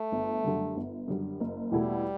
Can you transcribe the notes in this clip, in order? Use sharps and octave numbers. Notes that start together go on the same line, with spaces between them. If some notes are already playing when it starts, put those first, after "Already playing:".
Already playing: A3
G1
F#2 D3 G3
G1
F#2 D3 G3
F#1
E2 B2 G3 A3 E4